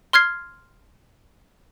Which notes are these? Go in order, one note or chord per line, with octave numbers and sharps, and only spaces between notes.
C6 F6 G#6 C7